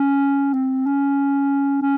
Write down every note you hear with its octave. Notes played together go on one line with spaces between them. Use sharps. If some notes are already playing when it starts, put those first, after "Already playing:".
Already playing: C#4
C4
C#4
C#4